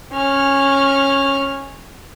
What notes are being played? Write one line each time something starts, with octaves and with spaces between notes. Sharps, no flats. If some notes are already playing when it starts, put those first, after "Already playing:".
C#4 F6